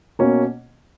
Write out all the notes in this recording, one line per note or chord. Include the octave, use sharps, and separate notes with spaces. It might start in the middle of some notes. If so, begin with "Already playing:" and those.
B2 A#3 C#4